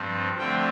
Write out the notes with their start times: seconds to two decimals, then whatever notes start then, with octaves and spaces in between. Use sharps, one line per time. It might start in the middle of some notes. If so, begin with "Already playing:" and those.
Already playing: G2 F3 C4
0.39 D3 F3 A3 C4 G5